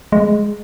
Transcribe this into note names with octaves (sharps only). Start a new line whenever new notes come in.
G#3